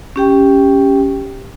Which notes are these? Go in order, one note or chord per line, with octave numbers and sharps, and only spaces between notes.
C#4 G4 G5